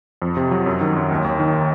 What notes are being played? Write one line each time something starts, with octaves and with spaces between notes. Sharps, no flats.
F2
C3
F#3
F#2
D#3
F#2
D#2
D#2
D#3